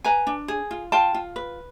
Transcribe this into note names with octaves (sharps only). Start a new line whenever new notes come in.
B4 G#5 A#5
D4
G#4
F4
F4 G5 A5
F4
B4